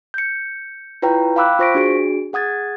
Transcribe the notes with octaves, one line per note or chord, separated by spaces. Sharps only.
G6 C#7
E4 F4 B4 C#5 G5 A#5
F5 G5 B5 D6 E6 F#6
F4 C5 C#6 A#6 B6 D7
D4 F#4 G#4 D7
G#4 F#5 D#6 G#6 A6